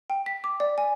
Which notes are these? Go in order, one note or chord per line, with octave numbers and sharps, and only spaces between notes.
G5
B6
D6
D5
G#5